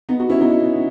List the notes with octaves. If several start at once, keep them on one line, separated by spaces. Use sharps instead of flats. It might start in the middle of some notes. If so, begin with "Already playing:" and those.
B3 D#4
D#4 F#4
C#4 E4
B3 D#4